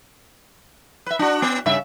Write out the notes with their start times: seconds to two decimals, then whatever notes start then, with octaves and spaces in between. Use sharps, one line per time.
1.06 B4 E5
1.19 D4 F#4
1.42 B3
1.66 G2 C#3 E5